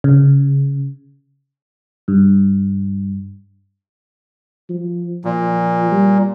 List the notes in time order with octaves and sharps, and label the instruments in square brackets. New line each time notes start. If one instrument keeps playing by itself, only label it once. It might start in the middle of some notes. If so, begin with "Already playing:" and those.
[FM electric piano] C#3
G2
[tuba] F3
[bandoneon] A#2 [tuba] F3
[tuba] G3